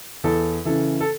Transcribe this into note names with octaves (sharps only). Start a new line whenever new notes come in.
E2 A4
C#3 E3 A4
A4